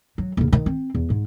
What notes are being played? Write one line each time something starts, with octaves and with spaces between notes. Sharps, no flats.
F#3
D#2 C#3
D#3
C4
E2
G#2